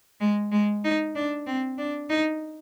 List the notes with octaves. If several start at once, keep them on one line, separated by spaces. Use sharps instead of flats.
G#3
G#3
D#4
D4
C4
D4
D#4